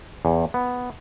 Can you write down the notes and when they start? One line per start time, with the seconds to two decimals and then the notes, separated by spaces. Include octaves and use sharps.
0.25 E2
0.54 B3